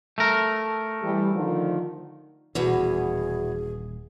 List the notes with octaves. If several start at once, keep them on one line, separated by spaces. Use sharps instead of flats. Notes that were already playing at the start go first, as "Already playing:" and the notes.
A3 A#4
E3 G3
D3 D#3 F3
D#1 E2 B2 E3 G#4